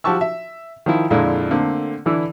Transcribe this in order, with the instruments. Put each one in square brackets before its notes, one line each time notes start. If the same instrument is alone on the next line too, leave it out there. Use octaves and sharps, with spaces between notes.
[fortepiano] F3 F#4 G4 A5 C#6 E6
E5
D#3 F3 E4
F2 A#2 D3 G#3 E4
D3 A3 A#3 C4
D3 E3 D4 E4